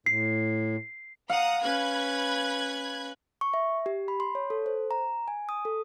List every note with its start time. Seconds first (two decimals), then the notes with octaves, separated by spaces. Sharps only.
0.06 A2 C7
1.30 F5 F#5 A#5 D#6
1.63 C#4 B4 B5 F#6 G#6
3.41 C#6
3.54 E5
3.86 G4
4.08 B5
4.20 C6
4.35 C#5
4.50 A4
4.66 C5
4.91 A#5
5.28 G#5
5.49 D#6
5.65 A4